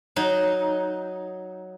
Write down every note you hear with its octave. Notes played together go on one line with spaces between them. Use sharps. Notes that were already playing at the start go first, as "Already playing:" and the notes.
F#3 D#4